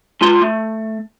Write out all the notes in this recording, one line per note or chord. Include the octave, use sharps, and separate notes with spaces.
G#3 F4 C6
A3